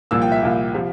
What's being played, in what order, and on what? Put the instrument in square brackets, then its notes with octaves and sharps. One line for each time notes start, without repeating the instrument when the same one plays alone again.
[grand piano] C2 A#2 F3 A#3 E6
G5
E5
C2 A#2 F3 A#3
C3 F3